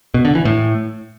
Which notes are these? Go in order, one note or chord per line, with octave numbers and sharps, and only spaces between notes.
B2
D3
E3
A2